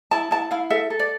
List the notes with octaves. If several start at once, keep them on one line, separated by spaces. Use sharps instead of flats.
E4 A5
E4 A5
E4 F5
A4 E5
A4
D5